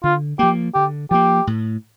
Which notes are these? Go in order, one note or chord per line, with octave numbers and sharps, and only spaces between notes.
D3 F4
F3 A#3 G4
D3 G4
F3 A#3 G4
A2